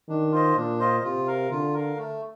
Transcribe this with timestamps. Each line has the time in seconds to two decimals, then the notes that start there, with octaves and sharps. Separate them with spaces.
0.08 D#3 D4
0.32 F4 C5 D#5
0.56 A#2 D4
0.79 F4 C5 D#5
1.03 C3 F4
1.27 A#4 F5
1.50 D3 F4
1.74 A#4 F5
1.98 A3